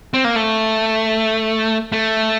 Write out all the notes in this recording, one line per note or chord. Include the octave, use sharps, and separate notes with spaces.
C4
A#3
A3
A3